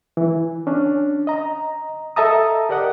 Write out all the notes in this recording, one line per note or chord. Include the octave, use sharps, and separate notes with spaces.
E3
C#4 D4
D#5 A#5
A4 D#5 E5 A5 A#5 D#6
G4 A#4 D5 D#5 F#5